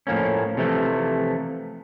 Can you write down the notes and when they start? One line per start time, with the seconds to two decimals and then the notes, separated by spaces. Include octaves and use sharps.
0.07 A2 F3 A#3 C#4
0.57 C3 E3 F3 A3